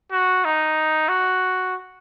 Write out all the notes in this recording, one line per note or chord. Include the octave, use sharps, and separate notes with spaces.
F#4
D#4
F#4